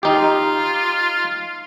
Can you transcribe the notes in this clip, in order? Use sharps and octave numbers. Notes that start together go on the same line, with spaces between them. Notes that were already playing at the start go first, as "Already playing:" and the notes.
D#4 F4 G4